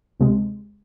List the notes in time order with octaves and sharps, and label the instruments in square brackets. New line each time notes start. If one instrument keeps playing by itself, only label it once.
[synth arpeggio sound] D2 C3 G#3